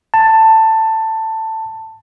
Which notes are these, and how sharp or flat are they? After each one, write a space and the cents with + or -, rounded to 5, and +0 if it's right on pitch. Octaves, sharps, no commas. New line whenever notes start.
A5 +15